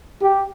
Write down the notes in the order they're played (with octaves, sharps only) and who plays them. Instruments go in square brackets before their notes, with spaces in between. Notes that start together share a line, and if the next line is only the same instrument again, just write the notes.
[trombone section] G4